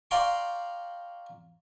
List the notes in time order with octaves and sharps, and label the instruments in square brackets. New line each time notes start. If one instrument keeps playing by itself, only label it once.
[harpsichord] D5 F5 G5 A#5 C6 C#6